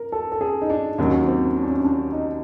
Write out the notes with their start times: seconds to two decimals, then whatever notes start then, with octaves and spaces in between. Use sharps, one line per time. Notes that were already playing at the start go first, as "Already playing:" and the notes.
Already playing: A#4
0.12 A4
0.32 A4
0.41 G#4
0.62 D#4
0.70 D4
0.98 D#2 D#3 F#3 C#4
1.27 C4
1.55 C#4
1.63 D4
1.71 C#4
1.85 D4
2.13 D#4